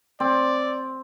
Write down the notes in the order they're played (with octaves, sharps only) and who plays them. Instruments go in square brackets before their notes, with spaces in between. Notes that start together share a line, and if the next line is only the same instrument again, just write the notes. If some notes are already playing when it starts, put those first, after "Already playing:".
[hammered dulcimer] C4 [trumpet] D5